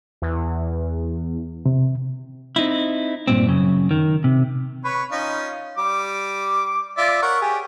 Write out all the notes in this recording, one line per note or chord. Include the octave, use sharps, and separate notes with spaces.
E2
C3
C4 D#4 E4
G2 A#2 C4
F#2 C#3
D#3
C3
B4 C#5
C#4 D#4 F4
G3 D6
F4 D5 E5
A#4 C#5 F#5
G4 G#4